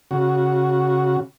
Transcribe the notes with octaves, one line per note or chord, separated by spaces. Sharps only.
C#3 F#4